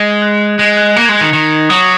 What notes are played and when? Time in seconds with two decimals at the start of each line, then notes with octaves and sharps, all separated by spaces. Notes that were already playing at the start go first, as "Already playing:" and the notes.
Already playing: G#3
0.10 G#6
0.22 F#6
0.58 G#3 F#6
0.77 F#6
0.95 A#3 F#6
1.05 G#3 G#6
1.14 A#6
1.21 D#3 C#7
1.33 D#3
1.69 F#3 D#6